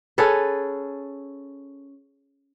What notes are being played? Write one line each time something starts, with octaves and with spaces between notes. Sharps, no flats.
C#4 G#4 A4 B4